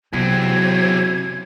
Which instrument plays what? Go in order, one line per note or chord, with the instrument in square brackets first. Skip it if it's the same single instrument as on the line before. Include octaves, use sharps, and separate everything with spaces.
[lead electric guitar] E2 C4 [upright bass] C3 [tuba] F#3 [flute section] G#6